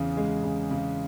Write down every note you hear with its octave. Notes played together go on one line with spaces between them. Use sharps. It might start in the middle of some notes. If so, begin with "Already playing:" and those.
Already playing: E2 C#3
G#3
C#3
C#3